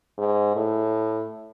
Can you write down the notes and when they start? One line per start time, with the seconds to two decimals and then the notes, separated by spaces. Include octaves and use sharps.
0.18 G#2
0.56 A2